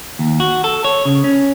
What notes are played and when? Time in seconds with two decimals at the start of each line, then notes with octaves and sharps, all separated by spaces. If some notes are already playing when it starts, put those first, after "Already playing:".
0.19 D#2
0.40 F#4
0.64 A4
0.84 C#5
1.05 C#3
1.24 C#4